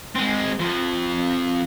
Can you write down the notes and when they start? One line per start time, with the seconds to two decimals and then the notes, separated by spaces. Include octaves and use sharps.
0.15 G#3 C4
0.59 F2 F3